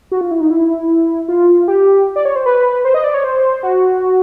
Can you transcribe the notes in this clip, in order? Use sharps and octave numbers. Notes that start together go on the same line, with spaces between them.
F#4
F4
E4
D#4
E4
F4
G4
D5
C#5
C5
B4
C5
D#5
D5
C#5
C5
F#4